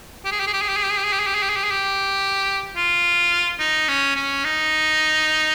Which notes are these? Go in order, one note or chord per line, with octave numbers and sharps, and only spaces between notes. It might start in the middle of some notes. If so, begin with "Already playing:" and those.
G4
G#4
G4
G#4
G4
G#4
G4
G#4
G4
G#4
G4
G#4
G4
G#4
G4
G#4
G4
G#4
G4
G#4
G4
F4
D#4
C#4
C#4
D#4